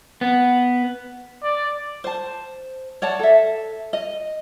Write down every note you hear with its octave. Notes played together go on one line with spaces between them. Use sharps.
B3
D5
C5 A5
C#5 D5 F#5 A5
A4 E5
D#5